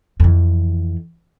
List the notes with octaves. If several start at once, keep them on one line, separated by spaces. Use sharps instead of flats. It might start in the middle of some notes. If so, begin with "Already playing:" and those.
F2 E3